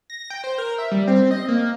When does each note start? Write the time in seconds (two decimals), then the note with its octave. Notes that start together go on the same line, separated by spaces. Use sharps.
0.10 A#6
0.30 G5
0.44 C5
0.58 A#4
0.78 E5
0.91 G3
1.08 C4
1.31 D#5
1.48 A#3